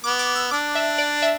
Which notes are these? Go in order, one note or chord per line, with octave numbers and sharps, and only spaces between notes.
B3 D6
D6
E6
D4 D6
E5
D5
E5